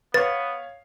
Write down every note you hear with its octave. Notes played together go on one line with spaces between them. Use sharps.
B3 B4 C#5 F5 A6